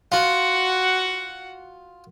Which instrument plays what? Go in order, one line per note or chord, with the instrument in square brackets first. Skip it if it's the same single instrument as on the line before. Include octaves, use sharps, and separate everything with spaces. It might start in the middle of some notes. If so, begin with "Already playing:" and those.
[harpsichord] F4 [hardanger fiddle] F#4 F#5